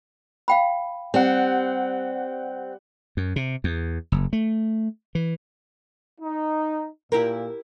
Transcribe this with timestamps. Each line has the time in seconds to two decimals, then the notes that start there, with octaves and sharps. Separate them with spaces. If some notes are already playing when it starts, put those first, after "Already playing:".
0.48 F5 G5 B5
1.14 G3 C4 F#5
3.17 F#2
3.36 C3
3.64 E2
4.12 F#1
4.33 A3
5.15 E3
6.21 D#4
7.12 A#2 E4 G4 A#4